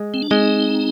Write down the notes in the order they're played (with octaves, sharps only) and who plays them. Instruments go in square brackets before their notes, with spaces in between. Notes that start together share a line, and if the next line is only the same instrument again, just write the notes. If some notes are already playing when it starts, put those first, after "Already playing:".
Already playing: [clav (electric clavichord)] G#3
[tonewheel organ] C4
D4
[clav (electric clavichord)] G#3 [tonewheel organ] C4 D#4